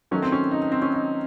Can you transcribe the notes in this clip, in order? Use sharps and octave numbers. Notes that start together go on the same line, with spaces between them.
D#3 F#3 A3 C#4
C4
C#4
D#4
D#4
C4
C#4
D#4